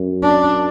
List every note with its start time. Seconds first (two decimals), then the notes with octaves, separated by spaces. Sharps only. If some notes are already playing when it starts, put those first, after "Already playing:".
Already playing: F#2
0.23 D4